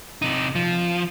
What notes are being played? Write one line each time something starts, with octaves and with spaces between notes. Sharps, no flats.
C3 D#4
F3